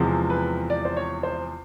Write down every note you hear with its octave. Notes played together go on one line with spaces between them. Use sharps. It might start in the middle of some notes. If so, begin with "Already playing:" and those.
Already playing: E2 C3 F3 G#3 C4
B4
D5
C5
C#5
C5